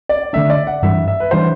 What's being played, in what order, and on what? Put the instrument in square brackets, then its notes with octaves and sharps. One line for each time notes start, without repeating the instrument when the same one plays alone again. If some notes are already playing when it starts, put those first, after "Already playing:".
[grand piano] D5
[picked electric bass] D3 A3 D4 [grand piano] E5
[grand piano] D5
F#5
[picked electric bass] G2 E3 G3 D4 [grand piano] E5
[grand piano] E5
B4
[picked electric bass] E3 G3 D4 [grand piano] C5